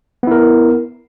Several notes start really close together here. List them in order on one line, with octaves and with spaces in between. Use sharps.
B3 E4 A#4